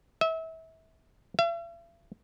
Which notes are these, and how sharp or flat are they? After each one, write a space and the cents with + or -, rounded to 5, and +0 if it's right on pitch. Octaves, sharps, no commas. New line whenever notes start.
E5 -30
E5 +45